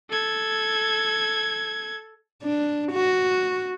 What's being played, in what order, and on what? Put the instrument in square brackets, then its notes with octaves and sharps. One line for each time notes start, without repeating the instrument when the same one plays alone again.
[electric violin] A4 G#6
[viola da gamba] D4
F#4